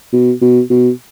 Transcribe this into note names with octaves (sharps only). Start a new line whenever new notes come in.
B2
B2
B2